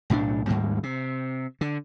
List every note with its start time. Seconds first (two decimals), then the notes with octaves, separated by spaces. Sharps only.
0.10 B1 A2 E3 D4
0.47 D#2 G#2 G3 A#3
0.83 C3
1.61 D3